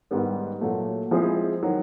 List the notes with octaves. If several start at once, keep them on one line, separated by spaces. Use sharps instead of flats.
G#2 D#3 G3 B3
A#2 F#3 A3
F3 G#3 C4 E4 G#4
D#3 F#3